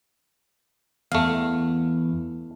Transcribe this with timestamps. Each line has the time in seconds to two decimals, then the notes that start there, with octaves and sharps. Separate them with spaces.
1.12 E2 A3 F5